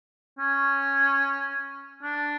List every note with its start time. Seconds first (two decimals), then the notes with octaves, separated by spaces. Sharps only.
0.39 C#4
2.03 D4